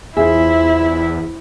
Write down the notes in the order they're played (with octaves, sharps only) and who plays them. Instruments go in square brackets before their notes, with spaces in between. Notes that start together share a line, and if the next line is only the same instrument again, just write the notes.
[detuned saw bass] E2 [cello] E4 [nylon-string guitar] F4 G#4 [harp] C5 E5